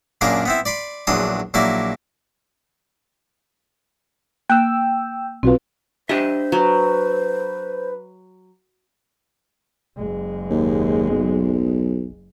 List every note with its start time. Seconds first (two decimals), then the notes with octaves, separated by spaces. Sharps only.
0.21 F#2 A#2 D4 G#4 A#4 F5
0.46 B3 C4 E4
0.65 D5 B5 C6 D6
1.07 A#1 E2 F#3 D4 C6 D#6
1.54 A#1 F#3 A#3 E4 D5 D6
4.49 A#3 G5 E6 F#6
5.43 B1 C4 F4 F#4 B4
6.09 D4 G4 C5 D#5 E5
6.52 F#3 B4
9.97 F#1 G#3
10.50 D#2
11.10 B1